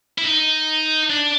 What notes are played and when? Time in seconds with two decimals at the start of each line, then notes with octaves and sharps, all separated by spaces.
0.18 E4
0.24 D#4
1.10 D4